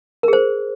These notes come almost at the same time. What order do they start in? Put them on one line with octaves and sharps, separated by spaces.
A#4 G#4 C5